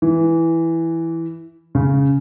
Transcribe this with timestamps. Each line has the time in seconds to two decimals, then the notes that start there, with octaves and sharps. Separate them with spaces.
0.02 E3
1.75 C#3